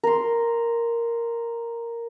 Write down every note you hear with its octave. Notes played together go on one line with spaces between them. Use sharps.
A#4 C6